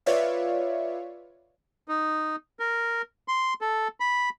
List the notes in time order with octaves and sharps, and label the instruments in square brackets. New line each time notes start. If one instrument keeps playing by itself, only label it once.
[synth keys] F4 B4 C#5 D5 E5 F5
[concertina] D#4
A#4
C6
A4
B5